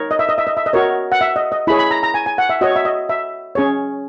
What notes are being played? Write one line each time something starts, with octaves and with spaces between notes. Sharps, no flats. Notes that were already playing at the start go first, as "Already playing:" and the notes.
Already playing: D#4 A#4 C#5
D#5
E5
D#5
E5
D#5
E5
D#5
F#4 A#4 C#5
F#5
E5
D#5
D#5
E4 G#4 C#5 B5
B5
A#5
A#5
G#5
G#5
F#5
E5
F#4 C#5 D#5
E5
D#5
E5
C#4 G#4 C#5